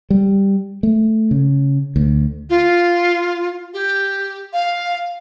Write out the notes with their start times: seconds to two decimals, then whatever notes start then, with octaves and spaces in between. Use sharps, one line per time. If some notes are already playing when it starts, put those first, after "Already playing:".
0.10 G3
0.83 A3
1.31 C#3
1.96 D2
2.49 F4
3.74 G4
4.53 F5